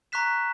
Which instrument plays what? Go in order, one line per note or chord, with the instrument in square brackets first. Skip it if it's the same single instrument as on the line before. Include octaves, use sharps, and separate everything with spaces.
[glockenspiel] A#5 C#6 F#6 B6 E7